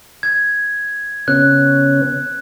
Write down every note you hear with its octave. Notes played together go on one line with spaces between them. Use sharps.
G#6
C#3 B3 C#4 F#6